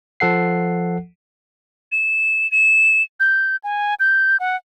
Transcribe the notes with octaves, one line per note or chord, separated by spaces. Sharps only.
F3 A4 F#5 C7
E7
E7
G6
G#5
G6
F#5